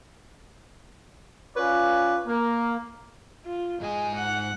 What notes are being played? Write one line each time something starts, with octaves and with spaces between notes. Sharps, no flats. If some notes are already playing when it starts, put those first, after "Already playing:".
C#4 F4 B4 C#5 D5
A#3
F4
G#2 G#3 G#5
F#5